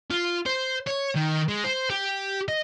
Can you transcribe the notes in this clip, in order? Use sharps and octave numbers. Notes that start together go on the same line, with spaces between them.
F4
C5
C#5
D#3
G#3
C5
G4
D#5